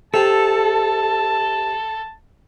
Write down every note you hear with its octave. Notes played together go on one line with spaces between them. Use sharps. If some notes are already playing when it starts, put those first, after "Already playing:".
C3 A4 A5